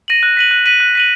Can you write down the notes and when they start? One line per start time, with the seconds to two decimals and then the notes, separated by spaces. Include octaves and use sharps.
0.08 A#6 D#7 F#7
0.23 F#6
0.37 B6 D#7 F#7
0.51 F#6
0.66 B6 D#7 F#7
0.80 F#6
0.95 B6 D#7 F#7